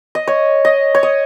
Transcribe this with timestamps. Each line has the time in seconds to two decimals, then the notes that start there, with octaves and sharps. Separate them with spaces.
0.15 D#5
0.27 C#5
0.65 D#5
0.95 C#5
1.03 D#5